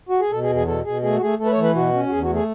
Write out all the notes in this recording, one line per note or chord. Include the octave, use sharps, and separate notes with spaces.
F#4
G#4
B2 A4
G#4
E2
G#4
B2 A4
B2 G#4
A3 G#4
F#4
A3 G#4
A3 A4
B4
C#5
E3
B4
B2 F#4
C#4
F#4
E2 G#4
F#4
A3
G#4